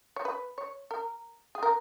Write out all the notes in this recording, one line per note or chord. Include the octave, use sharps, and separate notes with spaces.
C#5
B4
C#5
A#4
G#4
A#4